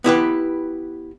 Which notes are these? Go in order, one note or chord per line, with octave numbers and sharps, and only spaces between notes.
B3 E4 G4 B4